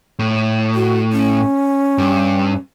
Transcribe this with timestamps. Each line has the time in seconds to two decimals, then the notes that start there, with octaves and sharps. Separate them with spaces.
0.19 A2
0.75 F#4
1.13 C#4
1.98 G2